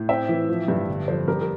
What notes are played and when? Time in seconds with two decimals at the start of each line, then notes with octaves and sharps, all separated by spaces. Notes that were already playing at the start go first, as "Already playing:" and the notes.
Already playing: A2
0.09 C4 E5 G5
0.29 E3
0.49 F3
0.68 G2
0.88 G1
1.08 F2 A4 C5
1.28 G2 G4 A#4
1.41 A#4